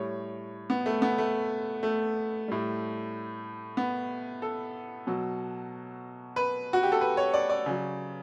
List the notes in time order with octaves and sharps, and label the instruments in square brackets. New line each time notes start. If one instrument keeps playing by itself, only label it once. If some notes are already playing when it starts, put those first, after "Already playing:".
Already playing: [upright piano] A2 G3 C#5
B3
A3
B3
A3
A3
A2 G3
B3
A4
B2 F#3
B4
F#4
G4
A4
B4
C#5
D5
D5
C#3 F#3